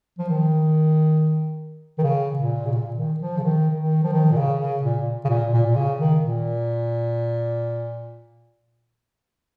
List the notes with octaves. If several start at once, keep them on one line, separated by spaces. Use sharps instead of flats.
F3
D#3
D#3
C#3
A#2
C#3
A#2
D#3
F3
C#3
D#3
D#3
F3
D#3
A#2
C#3
C#3
A#2
C#3
A#2
A#2
A#2
C#3
D#3
A#2